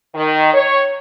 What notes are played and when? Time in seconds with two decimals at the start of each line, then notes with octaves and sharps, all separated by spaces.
0.15 D#3
0.54 C#5